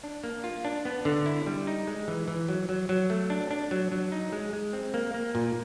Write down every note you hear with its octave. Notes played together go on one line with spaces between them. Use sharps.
D4
A#3
F4
D4
B3
D3
E4
G3
D#4
G#3
E3
E3
F#3
F#3
F#3
A3
D4
D4
F#3
F#3
D#4
G#3
G#3
C4
A#3
A#3
A#2